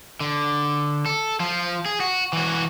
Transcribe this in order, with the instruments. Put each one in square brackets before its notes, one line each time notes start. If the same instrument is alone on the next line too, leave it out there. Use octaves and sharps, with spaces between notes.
[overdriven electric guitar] D3
A4
F3 F4
G#4
F#4
E3 F#4